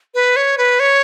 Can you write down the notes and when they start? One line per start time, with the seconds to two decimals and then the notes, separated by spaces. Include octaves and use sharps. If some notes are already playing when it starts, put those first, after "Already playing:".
0.14 B4
0.36 C#5
0.58 B4
0.80 C#5